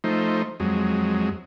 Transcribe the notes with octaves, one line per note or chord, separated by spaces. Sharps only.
F3 A3 D#4 C5
F2 F#3 G#3